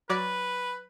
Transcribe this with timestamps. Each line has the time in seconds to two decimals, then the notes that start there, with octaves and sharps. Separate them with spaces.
0.09 F#3 F#4 B4 D5